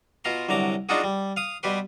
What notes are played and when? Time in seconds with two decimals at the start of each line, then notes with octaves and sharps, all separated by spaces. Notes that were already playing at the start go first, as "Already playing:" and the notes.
0.25 B2 F4 A#5 C6
0.49 C2 D3 F#3 A#5 D6
0.89 G#3 D4 D#4 F4 F#4 G#4
1.04 G3
1.36 F5 D#6
1.63 B2 G3 G4 B4 C6